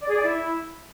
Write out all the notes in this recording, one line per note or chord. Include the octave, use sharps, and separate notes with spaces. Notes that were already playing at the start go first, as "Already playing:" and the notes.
D5
G#4
D5
E4